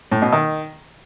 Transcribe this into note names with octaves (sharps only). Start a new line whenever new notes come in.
A2
B2
D#3